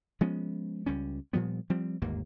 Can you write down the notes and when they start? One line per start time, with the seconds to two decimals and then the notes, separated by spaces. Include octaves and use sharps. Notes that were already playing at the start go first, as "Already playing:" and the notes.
0.21 F3 G#3 B3 C#4
0.86 C#2 G3 C#4
1.33 A#2 F3 G3 B3
1.70 F3 G3 C4
2.02 G1 D#2 G#2 A#3